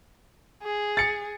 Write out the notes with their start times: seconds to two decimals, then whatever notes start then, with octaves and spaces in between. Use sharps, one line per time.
0.63 G#4
0.97 A6 C#7